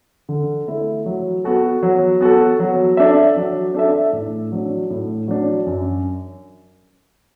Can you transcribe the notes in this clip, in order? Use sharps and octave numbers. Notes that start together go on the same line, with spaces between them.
D3
A3 E4
F#3
B3 F#4 A4
F#3
B3 F#4 A4
F#3
D4 A4 E5
F#3
D4 A4 E5
A2
F#3 D4
A2
F#3 D4
F#2